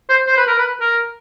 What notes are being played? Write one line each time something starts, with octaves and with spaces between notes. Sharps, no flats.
C5
C5
B4
A#4
B4
A#4